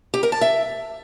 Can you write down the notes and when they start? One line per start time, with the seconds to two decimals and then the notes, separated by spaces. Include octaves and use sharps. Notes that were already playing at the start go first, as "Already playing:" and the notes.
0.14 G4
0.23 A#4
0.32 A5
0.41 E5